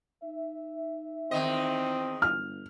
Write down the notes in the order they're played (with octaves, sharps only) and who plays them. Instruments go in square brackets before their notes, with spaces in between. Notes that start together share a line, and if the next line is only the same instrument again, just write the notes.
[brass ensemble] D#4 E5
[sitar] E2 D#3 D#5 [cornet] C4
[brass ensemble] G1 [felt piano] F6